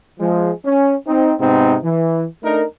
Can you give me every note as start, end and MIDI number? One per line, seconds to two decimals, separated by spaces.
0.20 0.52 53
0.20 0.52 56
0.65 0.96 61
1.07 1.34 60
1.07 1.34 63
1.40 1.76 44
1.40 1.76 48
1.40 1.76 59
1.40 1.76 60
1.40 1.76 63
1.83 2.25 52
2.43 2.64 57
2.43 2.64 62
2.43 2.64 63
2.43 2.64 70